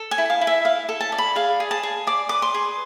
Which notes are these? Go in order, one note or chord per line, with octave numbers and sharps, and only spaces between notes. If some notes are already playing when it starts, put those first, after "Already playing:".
Already playing: A4
G#5
E4
F5
E4
E5
E4 F5
A4
A5
D5
B5
G#4 F5
G#4
A5
G#4
D5 D6
B4 D6
C6
G#4